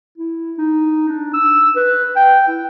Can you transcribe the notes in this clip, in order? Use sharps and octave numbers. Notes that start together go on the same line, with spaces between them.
E4
D#4
D4
E6
B4
G5
E4